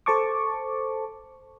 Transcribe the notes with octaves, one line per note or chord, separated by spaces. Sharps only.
A4 C5 A5 C#6 D6